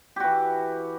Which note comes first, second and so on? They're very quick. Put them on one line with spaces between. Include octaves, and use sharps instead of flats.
G4 F#4 E3